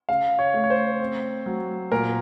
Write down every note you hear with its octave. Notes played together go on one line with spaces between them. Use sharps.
C#3 F5
C#5
A3
C#5
C5
C4
F#3
A#2 A#4